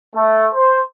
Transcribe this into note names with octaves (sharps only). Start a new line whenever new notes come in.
A3
C5